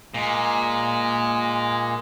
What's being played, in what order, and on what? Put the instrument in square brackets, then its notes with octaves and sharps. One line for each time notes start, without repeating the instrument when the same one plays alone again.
[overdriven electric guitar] A#2 [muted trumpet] G#3